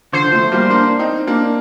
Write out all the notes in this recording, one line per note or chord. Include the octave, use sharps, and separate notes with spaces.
D3 F3 C5
F3 A3
G3 A#3
A#3 D4
C4 D#4
A#3 D4